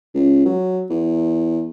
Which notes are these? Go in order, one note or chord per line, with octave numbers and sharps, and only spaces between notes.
C#2
F#3
E2